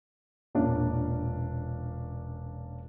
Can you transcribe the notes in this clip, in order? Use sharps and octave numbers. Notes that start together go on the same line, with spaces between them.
E1 A#2 A#3 C#4 D4 F4